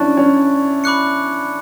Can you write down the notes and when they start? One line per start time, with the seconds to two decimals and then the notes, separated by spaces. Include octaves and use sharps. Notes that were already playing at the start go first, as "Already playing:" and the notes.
Already playing: C#4 D4 E4 D5 A5 C#6 F#6 A6
0.17 C#4
0.84 B5 D6 F#6 C#7